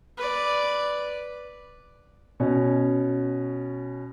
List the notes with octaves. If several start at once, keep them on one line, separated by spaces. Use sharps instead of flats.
B4 D5
B2 C#4